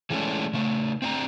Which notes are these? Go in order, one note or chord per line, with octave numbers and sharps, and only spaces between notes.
E3 F#3 G#3 A3 C#4 D4
C#3 A3
C4 D4 A#5